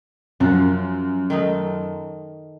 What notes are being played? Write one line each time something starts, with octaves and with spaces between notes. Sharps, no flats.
F#2 F3 F4 F#4
D#3 A3 D#4